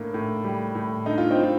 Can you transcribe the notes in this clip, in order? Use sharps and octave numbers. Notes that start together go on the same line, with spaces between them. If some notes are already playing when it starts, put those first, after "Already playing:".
Already playing: A2 A#3 D4
A2
G3
A2
D3 D#4
F4
C4 D#4
F4